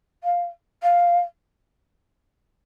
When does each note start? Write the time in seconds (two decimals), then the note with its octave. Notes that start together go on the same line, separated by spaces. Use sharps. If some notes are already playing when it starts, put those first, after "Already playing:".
0.23 F5
0.82 F5